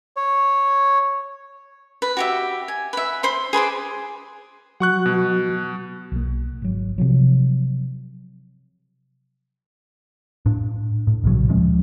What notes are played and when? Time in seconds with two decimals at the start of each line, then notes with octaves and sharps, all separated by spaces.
0.17 C#5
2.02 B4
2.17 F#4 G4 E5
2.68 G#5
2.93 B4 E5
3.23 C5 B5 C6
3.53 G#4 B4 C5 D5
4.80 F#3 F#5 C#6 F#6
5.06 B2
6.12 B1 A#3
6.62 G#1 F#3
6.98 C3 F3 F#3
10.46 A2 D4
11.07 A2
11.24 B1 A#2 C#3 F#3
11.49 D1 F3 G#3 C#4